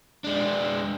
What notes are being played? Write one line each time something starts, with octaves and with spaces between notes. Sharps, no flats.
G#3 D4